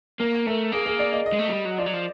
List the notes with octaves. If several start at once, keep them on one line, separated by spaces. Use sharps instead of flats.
A#3 A#4
A3 A#4
A#3 G#4
G#4
D5
D#5
D#5
G#3
A3
F#3
G3
F#3
F3 D5
F#3
F3